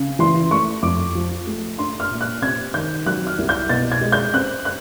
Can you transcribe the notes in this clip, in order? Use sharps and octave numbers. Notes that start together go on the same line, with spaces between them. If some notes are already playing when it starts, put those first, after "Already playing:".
Already playing: C#3
E3 C6
A3 C#6
F2 D6
F3
A3
D4 C6
F6
A#2
F#6
C3 G#6
D#3 G6
F#3 F#6
F6
C2
G6
B2 A6
G#6
G#3
G6
C4 F#6
F#6